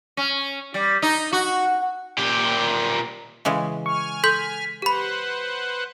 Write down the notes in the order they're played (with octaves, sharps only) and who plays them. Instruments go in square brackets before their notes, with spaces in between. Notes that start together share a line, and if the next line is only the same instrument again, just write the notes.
[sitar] C#4
G3
D#4
F#4
[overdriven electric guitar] A#2 G4
[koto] C#3 E3 G#3
[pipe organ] G#5 F6 [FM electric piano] C#6
[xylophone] A4 C6 G6 [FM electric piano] B6
[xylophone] G4 B5 [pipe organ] B4 C5 F#5